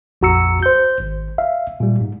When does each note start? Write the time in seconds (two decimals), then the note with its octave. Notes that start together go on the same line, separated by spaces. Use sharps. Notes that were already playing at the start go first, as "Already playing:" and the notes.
0.21 A#1 F2 F#4 A#5 E6 C#7
0.63 C5 G6
1.00 G#1
1.38 E5 F5
1.80 A#2 G3
2.01 G#2